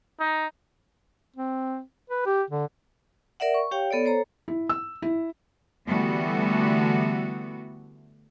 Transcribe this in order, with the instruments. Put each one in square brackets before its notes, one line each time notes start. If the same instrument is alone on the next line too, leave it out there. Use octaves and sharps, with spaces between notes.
[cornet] D#4
[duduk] C4
B4
G4
D3
[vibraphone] A#4 D5 E5 F#5
C#6
G4 C#5 F5 G5
B3 A4 C#5 D5
A4 C5 C#5 A#5
[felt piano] E4
E6
E4
[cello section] D3 E3 G3 A3 B3 F#4